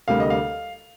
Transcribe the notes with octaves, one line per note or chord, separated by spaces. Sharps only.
D2 C3 G3 A#3 F5
D#5
F5